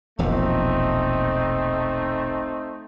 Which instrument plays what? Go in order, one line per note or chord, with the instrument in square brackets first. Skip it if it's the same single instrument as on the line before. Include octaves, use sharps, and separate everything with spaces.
[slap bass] E1 A#1 B2 [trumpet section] A3 C4 D#4